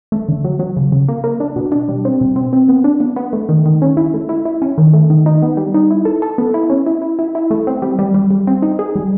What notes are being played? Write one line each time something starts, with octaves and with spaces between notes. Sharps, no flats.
A3
D3
F#3
F#3
C#3
C#3
A#3
A#3
D4
B2
D4
G3
C4
B2
C4
C4
B3
D4
B3
B3
A3
D#3
D#3
C#4
E4
A3
E4
E4
C#4
D#3
A3
D#3
D#4
B3
G3
D#4
E4
A4
A4
B3
E4
C#4
E4
E4
E4
E4
A3
C4
G3
G3
G3
G3
C4
D#4
G#4
G3